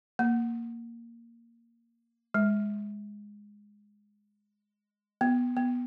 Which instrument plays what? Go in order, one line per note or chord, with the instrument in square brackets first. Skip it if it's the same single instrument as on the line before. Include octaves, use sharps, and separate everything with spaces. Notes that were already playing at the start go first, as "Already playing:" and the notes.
[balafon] A#3
G#3
B3
B3